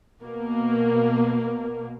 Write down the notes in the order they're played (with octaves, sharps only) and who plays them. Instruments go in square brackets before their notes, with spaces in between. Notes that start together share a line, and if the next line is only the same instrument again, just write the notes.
[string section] B2 A#3